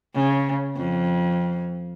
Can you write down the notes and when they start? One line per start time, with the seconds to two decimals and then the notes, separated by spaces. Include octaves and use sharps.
0.15 C#3
0.76 F2